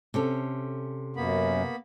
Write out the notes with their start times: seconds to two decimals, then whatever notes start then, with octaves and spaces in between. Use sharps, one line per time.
0.14 C3 C#4 A4
1.16 F#2 A#3 B3 B5